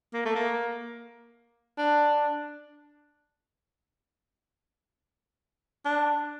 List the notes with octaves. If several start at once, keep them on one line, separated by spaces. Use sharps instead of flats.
A#3
A3
A#3
D4
D4